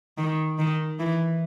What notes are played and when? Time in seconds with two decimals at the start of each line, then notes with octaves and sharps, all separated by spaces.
0.18 D#3
0.59 D#3
0.99 E3